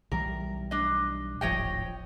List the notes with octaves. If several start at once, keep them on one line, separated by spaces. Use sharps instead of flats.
B1 E3 G3 A#4
D4 D#5
D1 G#1 F3 C#5 D#5 G5